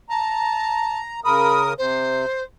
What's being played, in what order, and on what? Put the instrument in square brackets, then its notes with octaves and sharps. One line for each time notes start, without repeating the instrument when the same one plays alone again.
[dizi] A5 [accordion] A#5
[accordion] C#3 A#4 D#6 [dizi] B5
[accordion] C3 [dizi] C5